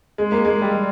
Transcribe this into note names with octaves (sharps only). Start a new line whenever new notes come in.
G#3
A#3
G#3
G3